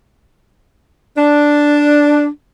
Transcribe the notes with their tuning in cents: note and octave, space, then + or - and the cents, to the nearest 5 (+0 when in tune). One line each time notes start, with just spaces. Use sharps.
D4 +0